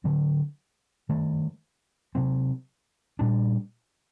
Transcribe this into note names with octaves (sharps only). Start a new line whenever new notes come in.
D3 F#3 C4
G2 D#3 A3
C3 F#3 C4
A#2 G3 D4